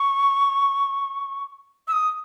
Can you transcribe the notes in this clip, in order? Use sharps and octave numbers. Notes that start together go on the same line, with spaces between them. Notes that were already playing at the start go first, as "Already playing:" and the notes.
Already playing: C#6
E6
D#6